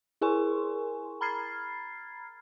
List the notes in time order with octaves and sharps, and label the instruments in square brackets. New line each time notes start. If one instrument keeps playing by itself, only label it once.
[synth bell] E4 G#4 A#4 G#5 C6 C#6
A#5 B5 F6 G#6 A6 C7